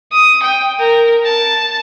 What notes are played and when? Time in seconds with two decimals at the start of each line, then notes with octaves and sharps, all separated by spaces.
0.12 D#6
0.43 G5
0.79 A#4
1.25 A5